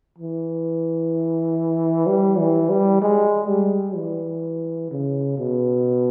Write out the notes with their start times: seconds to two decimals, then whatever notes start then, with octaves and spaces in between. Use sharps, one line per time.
0.18 E3
2.07 G3
2.39 E3
2.70 G3
3.02 G#3
3.48 G3
3.96 E3
4.91 C#3
5.38 B2